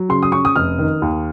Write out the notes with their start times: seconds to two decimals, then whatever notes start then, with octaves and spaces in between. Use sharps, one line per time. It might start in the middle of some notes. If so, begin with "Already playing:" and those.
Already playing: F#3
0.09 C#3 C6
0.23 D#6
0.32 C#4 C#6
0.45 D#6
0.56 F1 F6
0.78 D#3
1.02 D#2